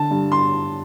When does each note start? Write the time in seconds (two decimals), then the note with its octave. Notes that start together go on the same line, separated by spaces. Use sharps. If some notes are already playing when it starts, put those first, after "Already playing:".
Already playing: D3 A5
0.11 G2
0.32 C6